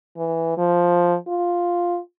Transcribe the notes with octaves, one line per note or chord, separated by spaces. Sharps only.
E3
F3
F4